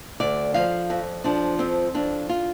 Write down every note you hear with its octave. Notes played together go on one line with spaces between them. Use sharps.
D2 D5
F3 F5
F2
F3 D4
F2 C4
F2 D4
F4